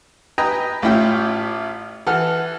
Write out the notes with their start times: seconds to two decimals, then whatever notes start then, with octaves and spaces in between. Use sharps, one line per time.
0.38 B4 D#5 G5 G#5 A#5
0.82 A1 A3 C#4 E4 F4 G5
2.07 E3 A4 F#5 F6